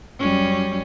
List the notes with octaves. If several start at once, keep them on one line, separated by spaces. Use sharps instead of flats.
F#2 G3 C#4